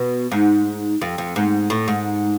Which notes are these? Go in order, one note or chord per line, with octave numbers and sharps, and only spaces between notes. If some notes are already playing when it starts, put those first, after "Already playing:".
Already playing: B2
G#2
F2
F2
G#2
A2
G#2